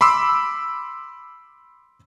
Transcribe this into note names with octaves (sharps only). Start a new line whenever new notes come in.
B5 C6 D6 E6